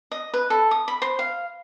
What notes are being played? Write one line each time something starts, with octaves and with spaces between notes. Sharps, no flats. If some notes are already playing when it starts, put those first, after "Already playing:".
D#5
B4
A4
D#6
B5
C5
F5